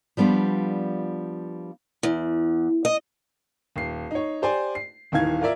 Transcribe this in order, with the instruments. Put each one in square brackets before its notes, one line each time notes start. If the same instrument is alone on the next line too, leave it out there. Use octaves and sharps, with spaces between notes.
[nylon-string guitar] F3 G3 B3 D4 F4
[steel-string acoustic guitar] E2
D#5
[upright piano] D#1 C7
D#4 C#5
G4 C5 D5 G#5
C7
D#1 D#3 E3 F5 G#6
F4 A#4 D5 E5